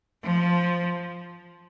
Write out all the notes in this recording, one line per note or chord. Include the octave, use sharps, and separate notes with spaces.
F3